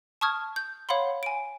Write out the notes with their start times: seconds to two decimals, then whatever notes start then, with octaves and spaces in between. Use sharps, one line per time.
0.21 A5 C#6 D#6 F6 G#6
0.56 G6
0.89 C#5 F5 F#5 B5 C6
1.23 G#5 D7